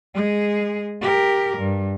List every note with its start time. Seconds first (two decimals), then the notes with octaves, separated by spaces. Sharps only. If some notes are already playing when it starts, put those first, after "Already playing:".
0.15 G#3 G#4
1.02 G4 A#4
1.58 G2